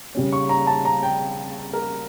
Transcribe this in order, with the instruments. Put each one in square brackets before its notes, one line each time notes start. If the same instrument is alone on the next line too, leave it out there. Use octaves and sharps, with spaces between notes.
[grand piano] C#3 G3 C#4
C#6
A#5
A5
A#5
G5
A#4